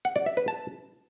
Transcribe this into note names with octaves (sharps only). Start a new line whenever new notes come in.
F#5
D5
E5
B4
A5